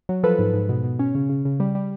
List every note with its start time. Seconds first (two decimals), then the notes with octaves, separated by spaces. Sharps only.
0.09 F#3
0.23 F3 A4 B4
0.39 G#2
0.53 G#2
0.69 B2
0.84 B2
0.99 C#4
1.15 C#3
1.29 C#3
1.45 C#3
1.60 G3
1.75 G3